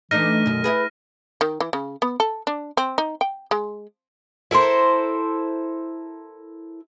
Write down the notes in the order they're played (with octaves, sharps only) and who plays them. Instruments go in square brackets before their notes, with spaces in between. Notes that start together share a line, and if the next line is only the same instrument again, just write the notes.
[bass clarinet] E3 [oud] A3 D4 D#4 [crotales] F6 A#6 D#7
[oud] F#2 D#3 [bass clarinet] B2
[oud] E4 F4 G#4 [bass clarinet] B4
[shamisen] D#3
E3
C#3
B3
A4
D4
C4
D#4
G5
G#3
[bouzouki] E4 A4 A#4 C5